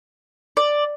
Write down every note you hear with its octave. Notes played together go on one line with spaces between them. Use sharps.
D5